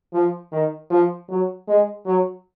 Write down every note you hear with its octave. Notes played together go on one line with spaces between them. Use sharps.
F3
D#3
F3
F#3
G#3
F#3